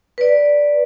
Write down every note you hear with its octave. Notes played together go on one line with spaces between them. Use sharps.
B4 D5